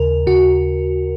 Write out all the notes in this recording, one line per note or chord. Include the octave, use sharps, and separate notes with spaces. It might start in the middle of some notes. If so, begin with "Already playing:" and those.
Already playing: D#2 C#3 A#4
D#2 C#3 F#4